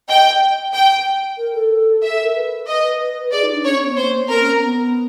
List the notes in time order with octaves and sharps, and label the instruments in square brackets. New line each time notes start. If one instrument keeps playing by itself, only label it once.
[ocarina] D#5 [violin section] G5
[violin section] G5
[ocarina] A#4
A4
[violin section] E5
[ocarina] A4
A#4
B4
[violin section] D#5
[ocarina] G#4 [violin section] D5
[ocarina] D#4
D4
[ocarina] C#4 [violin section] C#5
[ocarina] C4
B3
[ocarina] A#3 [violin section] C5
[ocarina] C4 [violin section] A#4
[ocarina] C#4
B3